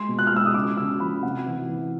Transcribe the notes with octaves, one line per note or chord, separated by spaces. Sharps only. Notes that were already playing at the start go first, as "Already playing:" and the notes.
Already playing: G#3 C6
B2
F#6
F6
G#3 E6
D#6
C#3 D6
C#3 E6
F3 B5
C3 F#5
E3
E3